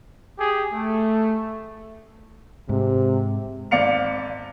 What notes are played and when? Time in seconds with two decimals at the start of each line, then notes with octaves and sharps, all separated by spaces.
0.39 G4 G#4
0.73 A3
2.69 G#2 C3
3.71 G#1 D5 F5 C#7 F7